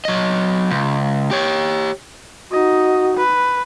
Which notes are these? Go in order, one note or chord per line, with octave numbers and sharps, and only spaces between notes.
F#3 D#5
C#2
G4 C#5
D#4 F#4 D#5
B4